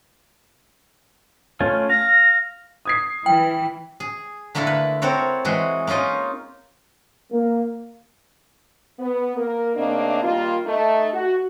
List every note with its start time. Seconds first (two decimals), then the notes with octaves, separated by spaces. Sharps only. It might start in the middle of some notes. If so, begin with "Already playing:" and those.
1.60 A3 C#4 F4
1.90 F5 A#6
2.85 D#6 G#6 C7
3.26 E3 G5
4.00 G#4
4.55 D3 A3 A#3 E4 A4 A#4
4.67 B4
5.02 C4 F#4 A4 A#4 C#5
5.45 E3 G#3 F#4 G#4
5.87 A#3 C#4 D#4 F4 D#5
7.32 A#3
8.99 B3
9.37 A#3 A#4
9.76 C#3 A3 A#3 C4 D4 D#4
10.23 D#3 G3 A#3 F4
10.66 A3 D#4
11.12 F#4